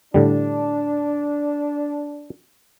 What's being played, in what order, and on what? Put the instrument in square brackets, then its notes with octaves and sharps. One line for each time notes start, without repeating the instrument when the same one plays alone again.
[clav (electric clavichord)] A2 D3 G3 [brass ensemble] D4